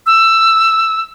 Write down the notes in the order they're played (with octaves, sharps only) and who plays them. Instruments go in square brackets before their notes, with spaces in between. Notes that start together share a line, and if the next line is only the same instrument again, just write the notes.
[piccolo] E6